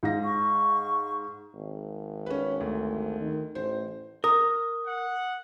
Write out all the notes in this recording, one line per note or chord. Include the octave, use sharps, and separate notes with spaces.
G#2 F5 A#6
C#6
G#1
C#4 B4
D2
D#3
A1 C5
A#4 D#6
F#5